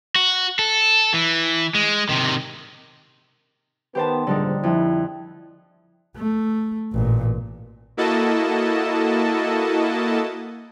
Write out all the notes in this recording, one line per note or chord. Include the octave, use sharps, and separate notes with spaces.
F#4
A4
E3
G#3
C3 D#3
D#3 B3 G4 C5 A5
A#1 G#2 D3 D#3 G3 D#4
F2 E4
A3
A1 A#2
A#3 E4 F#4 A4 D#5 A5